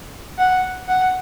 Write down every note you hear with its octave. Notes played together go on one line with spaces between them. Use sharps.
F#5
F#5